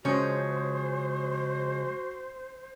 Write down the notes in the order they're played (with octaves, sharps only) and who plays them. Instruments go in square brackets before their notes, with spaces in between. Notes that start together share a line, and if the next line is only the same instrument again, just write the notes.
[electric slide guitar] C#3 F3 G#3 [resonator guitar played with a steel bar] C#4 [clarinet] F#4 [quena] C5